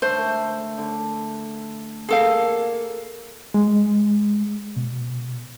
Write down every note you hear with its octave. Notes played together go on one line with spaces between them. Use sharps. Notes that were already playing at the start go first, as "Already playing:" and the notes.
D3 A3 C5
D3
A#3 G#4 A4 F5
G#3
B2